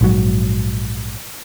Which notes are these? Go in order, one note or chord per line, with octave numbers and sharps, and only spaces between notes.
A#1 G#2 F#3